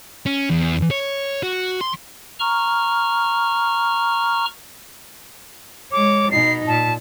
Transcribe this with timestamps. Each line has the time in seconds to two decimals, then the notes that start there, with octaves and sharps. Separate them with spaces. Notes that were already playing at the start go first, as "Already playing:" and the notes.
0.26 C#4
0.50 E2
0.91 C#5
1.43 F#4
1.81 C6
2.39 A#5 C#6 F6
5.92 G#3 C#5 D6
6.31 B2 D#4 C7
6.67 A#2 A5